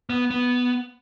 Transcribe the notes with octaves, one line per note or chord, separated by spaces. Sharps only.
B3
B3